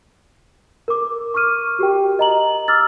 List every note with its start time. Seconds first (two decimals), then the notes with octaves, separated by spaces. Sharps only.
0.88 A#4 D6
1.34 C#6 D6 F6 D#7
1.79 F#4 G4 A#4 G5
2.19 D#5 A#5 F#7
2.68 D6 E6 F6 A6